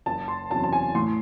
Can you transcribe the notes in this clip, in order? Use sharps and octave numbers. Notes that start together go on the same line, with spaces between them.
F#1 A5
C6
E2 C3 F#3 C#4 A5
A5
G#5
A2 C6